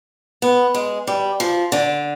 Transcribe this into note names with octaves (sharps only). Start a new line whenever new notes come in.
B3
G#3
G3
F3
D3